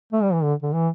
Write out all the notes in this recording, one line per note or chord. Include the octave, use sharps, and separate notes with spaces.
A3
G3
E3
D3
D3
E3